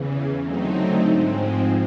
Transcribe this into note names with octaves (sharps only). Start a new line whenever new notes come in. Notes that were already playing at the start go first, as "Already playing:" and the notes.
Already playing: E2 C#3 E3
D3 F#3 A3 C4 D#4
G#2 F3 G#3 C4